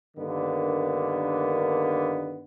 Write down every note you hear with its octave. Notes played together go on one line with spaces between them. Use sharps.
G2 D3 D#3 A#3 B3